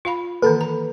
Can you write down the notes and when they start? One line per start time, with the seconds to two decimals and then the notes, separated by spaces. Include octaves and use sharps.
0.05 F4 F5 B5
0.42 D#3 E3 A#3 A4 B4
0.61 A#5